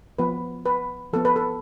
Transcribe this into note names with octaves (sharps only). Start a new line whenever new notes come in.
F3 B3 B4
B4
F3 B3 A4
B4
A4